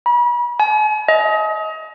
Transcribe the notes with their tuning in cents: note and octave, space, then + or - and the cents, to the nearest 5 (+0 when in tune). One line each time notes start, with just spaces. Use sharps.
B5 -40
G#5 +45
D#5 +30